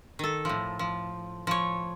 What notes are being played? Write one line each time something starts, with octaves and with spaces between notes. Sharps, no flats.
D#3 A4
A2 F3
F3
F3 C#5